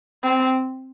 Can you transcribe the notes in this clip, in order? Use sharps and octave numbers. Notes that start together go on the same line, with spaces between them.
C4